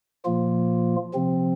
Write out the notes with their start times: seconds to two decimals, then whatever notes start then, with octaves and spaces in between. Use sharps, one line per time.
0.25 A#2 F3 A#3 F4
1.14 C3 F3 C4